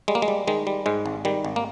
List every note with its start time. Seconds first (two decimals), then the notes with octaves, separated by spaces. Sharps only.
0.08 G3 G#3
0.15 A#3
0.22 G#3
0.28 G3
0.47 D#3 G#3
0.67 G3
0.86 G#2 G#3
1.06 G#1
1.25 D#3 G3
1.45 G#1
1.56 A#3